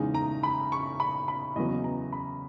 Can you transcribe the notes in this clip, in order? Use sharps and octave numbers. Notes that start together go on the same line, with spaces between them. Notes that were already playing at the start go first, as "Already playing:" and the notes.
Already playing: E2 C#3 G#3 D#4
A#5
B5
C#6
B5
B5
E2 C#3 F#3 B3 D#5
A#5
B5